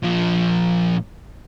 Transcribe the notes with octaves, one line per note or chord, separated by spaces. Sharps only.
A#2 F3